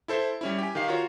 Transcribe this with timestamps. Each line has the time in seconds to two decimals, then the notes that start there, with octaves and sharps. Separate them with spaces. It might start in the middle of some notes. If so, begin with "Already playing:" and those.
0.08 E4 A4 C5
0.41 G3 C#4 E4
0.58 G4 G#5
0.75 D#3 G4 F5 C7
0.88 F4 F#4 A#4 C#5